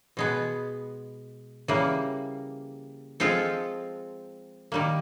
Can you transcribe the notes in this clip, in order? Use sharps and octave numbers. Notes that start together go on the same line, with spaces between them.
B2 G#3 B3
C#3 E3 G3 A#3
F3 G#3 C4 F4 A4
D#3 G3 A#3